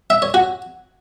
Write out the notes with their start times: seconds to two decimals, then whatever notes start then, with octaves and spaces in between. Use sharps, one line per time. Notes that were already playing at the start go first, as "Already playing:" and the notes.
0.10 E5
0.22 C#5
0.34 F#4